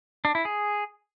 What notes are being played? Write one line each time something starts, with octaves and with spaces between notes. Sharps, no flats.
D4
E4
G#4